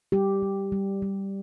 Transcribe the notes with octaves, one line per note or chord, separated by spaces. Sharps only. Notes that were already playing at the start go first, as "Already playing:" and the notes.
G3 G4
G3
G3
G3